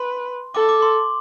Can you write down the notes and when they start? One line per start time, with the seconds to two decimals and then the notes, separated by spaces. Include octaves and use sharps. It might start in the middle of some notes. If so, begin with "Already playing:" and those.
Already playing: B4 C6
0.55 A4 D6
0.69 D6
0.82 C6